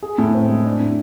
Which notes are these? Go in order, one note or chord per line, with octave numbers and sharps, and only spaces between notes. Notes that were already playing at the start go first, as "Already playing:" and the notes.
G#4
A2
C4
G#3
D4
A2